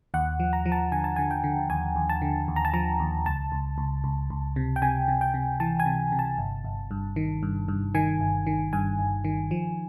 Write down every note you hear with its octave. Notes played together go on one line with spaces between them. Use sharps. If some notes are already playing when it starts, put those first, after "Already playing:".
D#2 F#5
F3
A#5
F3
A5
D3 G#5
A5
D3 G#5
G5
D3
D#2 G#5
D#2
A5
D3
D#2
A#5
A5
F3 A#5
D#2
C#2 A5
C#2
C#2
C#2
C#2
C3
G5
C3 G#5
C3
G5
C3
E3 A5
G#5
C3
C3
A5
G1
G1
G2
D#3
G2
G2
D#3 G#5
G1
D#3
G2 G#5
G1
D#3
F3